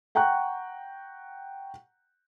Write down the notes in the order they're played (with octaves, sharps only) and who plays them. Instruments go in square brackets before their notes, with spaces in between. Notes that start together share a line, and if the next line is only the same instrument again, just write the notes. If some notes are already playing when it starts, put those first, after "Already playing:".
[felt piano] F#5 G5 A#5 C#6 F#6